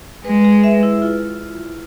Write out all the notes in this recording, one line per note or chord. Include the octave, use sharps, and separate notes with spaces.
G#3 B4
G#4
E5
E4
F4